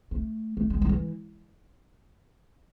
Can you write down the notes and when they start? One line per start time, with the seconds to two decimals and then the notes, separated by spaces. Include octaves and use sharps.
0.11 A3
0.57 A3
0.70 G#3
0.82 F#3
0.89 E3